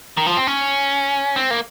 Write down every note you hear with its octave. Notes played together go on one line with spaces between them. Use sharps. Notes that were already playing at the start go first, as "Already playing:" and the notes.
D#3
F3
C4
C#4
C4
A#3